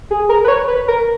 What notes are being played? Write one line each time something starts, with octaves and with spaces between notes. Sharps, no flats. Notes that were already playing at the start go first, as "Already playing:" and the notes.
G#4
A#4
B4
C#5
B4
A#4